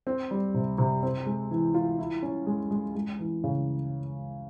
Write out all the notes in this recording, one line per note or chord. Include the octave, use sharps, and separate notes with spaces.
C4
G3
C3
C3
C4
G#3
E3
F4
E4
C#4
G#3
G#3
G#3
E3
C#3